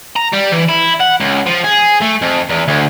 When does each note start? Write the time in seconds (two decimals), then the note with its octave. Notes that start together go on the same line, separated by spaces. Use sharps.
0.16 A#5
0.33 G3
0.52 E3
0.69 E4
1.00 F#5
1.20 C#2
1.46 F3
1.64 G#4
2.02 A3
2.22 F2
2.49 E2
2.68 D2